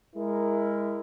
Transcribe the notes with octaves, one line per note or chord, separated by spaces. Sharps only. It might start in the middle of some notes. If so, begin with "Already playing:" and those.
G#3 E4 A#4